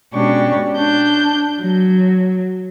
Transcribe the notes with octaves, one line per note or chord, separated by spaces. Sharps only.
B2 G#3 C#4 D4 G4 C#6
D4 G6
F#3